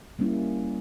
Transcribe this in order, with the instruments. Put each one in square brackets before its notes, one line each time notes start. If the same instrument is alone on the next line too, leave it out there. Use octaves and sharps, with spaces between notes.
[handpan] G3 A#3 C#4 E4